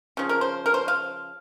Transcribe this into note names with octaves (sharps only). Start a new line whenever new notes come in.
C#3 F3
A#4
C5
A#4
C5
F5